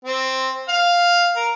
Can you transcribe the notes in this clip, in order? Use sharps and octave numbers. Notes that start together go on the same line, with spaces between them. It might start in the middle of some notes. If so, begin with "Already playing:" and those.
C4
F5
A#4